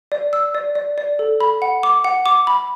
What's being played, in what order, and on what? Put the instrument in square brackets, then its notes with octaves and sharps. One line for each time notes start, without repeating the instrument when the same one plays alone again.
[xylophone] D5
E6
D5
D5
D5
A4
B5
F#5
D6
F#5
D6
B5